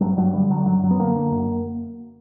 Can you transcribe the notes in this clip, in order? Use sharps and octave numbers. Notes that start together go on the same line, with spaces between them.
G2 F#3
G2 F#3
D3 G3
D3 F#3
F#2 F#3
F#2 F#3
B3
D3 A#3
D3
F#2